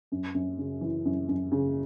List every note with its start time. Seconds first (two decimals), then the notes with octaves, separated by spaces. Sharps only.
0.12 F#2
0.35 F#2
0.58 C#3
0.81 E3
1.05 F#2
1.28 F#2
1.52 C#3